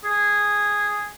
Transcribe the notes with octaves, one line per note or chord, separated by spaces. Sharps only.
G#4